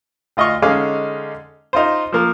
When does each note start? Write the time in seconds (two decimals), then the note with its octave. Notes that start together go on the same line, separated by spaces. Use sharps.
0.37 D2 F4 D#5 F5 C#6
0.62 D3 G#3 C#4 D#4 F5 D6
1.73 D#4 F4 C5
2.12 F3 A#3 A#4